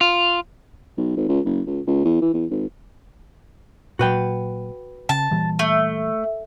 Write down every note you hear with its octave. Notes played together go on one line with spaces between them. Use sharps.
F4
B1
G#1
C#2
F#1
C#2
C#2
E2
E3
E2
G#1
A#2 F#3 F#4 B4 G5
C#3 A5
A#2 E3 G3
A3